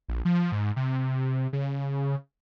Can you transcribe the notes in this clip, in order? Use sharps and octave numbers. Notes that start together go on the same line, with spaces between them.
A#1
F3
G#2
C3
C#3